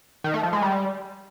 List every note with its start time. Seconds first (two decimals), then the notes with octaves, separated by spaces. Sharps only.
0.24 D#3
0.34 A3
0.43 F3
0.53 G#3
0.62 G3